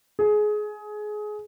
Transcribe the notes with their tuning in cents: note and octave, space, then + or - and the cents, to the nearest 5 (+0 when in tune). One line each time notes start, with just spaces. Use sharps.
G#4 +20